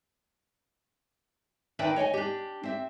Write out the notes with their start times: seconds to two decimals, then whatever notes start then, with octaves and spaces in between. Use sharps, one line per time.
1.79 D#3 D4 B4 E5 G5
1.96 C#5 D#5 G5 G#5
2.14 D4 G4
2.63 C4 E5